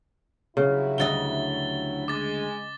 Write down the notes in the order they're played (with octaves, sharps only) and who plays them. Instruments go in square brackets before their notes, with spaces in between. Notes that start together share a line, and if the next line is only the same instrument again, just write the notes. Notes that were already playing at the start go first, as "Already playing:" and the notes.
[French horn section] G2 F#3 E4 [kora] C#3
[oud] D2 F#4 D#5 [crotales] A6 G7
[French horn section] G#3 [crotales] D6 A6